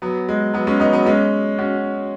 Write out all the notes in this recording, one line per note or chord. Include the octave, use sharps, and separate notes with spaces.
F#3 B3
G#3
F#3 B3
G#3 C#4
B3 D#4
F#3 B3
G#3 C#4
C#4 F#4